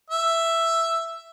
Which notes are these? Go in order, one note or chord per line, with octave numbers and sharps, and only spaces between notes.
E5